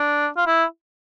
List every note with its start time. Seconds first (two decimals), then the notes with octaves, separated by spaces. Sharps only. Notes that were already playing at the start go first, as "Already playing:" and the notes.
Already playing: D4
0.37 F4
0.47 E4